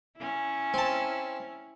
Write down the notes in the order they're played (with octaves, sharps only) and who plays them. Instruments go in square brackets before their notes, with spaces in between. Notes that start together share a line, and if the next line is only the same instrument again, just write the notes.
[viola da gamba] C#4 E4
[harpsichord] C4 A5